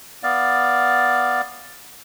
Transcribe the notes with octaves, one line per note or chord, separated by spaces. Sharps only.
B3 D5 F5